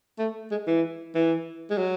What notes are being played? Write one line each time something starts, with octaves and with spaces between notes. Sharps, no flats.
A3
G#3
E3
E3
G#3
F#3